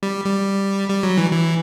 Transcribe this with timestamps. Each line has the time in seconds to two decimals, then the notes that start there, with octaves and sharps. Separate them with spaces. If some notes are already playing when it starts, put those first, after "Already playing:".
0.03 G3
0.25 G3
0.89 G3
1.03 F#3
1.18 E3
1.31 E3